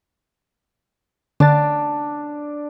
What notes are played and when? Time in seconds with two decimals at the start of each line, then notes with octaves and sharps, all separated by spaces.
1.40 D3 D4 A6